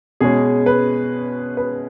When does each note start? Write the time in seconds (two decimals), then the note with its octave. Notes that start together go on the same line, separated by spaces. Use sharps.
0.20 B2 G#3 C#4 G#4
0.66 B4
1.57 B4